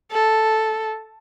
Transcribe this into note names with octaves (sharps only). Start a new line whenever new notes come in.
A4